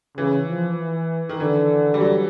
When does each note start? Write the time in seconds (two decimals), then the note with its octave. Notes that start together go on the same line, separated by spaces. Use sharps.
0.17 C#3 E3
0.48 F3
0.78 E3
1.29 D#3
1.40 D3 E3
1.94 G3
2.00 F#3